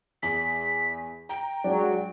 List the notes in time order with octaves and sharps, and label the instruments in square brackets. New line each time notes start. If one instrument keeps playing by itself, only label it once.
[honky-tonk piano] E2 [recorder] B6
[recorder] G5 [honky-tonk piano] A#5
[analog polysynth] F#3 [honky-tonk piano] G#3 D4